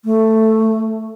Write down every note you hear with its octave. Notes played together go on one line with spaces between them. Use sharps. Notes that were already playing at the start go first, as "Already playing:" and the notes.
A3